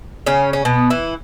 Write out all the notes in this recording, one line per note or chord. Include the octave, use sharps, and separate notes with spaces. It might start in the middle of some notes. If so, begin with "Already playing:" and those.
C#3 C#4
C#4
B2 B3
E3 E4